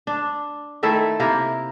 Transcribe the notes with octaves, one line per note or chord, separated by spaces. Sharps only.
D4
D#3 A3 E4 A4
C3 A#3 E4 A#4